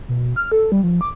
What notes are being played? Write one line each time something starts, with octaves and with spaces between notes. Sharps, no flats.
B2
F6
A4
G3
F3
D6